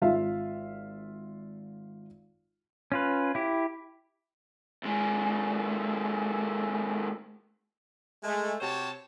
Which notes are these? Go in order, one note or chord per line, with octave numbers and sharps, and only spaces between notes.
G#1 F4 E5 F5
C#4 F4 B4
E4 G4
D#2 G#3
G#3 A3
C3 F#4 G4 C5 C#5 A5